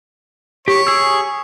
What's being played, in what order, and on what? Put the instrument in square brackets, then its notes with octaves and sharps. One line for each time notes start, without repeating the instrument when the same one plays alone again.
[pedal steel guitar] G4 [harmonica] C#5
[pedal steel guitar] G#4 E6